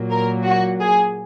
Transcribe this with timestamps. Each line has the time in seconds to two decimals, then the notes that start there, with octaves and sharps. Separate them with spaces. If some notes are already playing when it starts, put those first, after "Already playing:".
Already playing: A#2 F#3 A#3
0.11 A#4
0.45 F#4
0.80 G#4